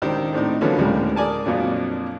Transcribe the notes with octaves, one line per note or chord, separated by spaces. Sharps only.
C#2 D#3 D4 G4 C5
A2 C4 D4 D#4
D3 F3 F#3 A#3 B3 C#4
D2 A2 C#3 G3 G#3 A#3
G#4 A#4 D5 G#5 A5
F2 A#2 F3 F#3 D4